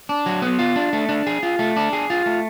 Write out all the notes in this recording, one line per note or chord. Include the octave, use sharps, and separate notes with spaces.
D4
F#3
B3
F4
D4
A3
D4
G#4
F4
A3
D4
G#4
F4
A3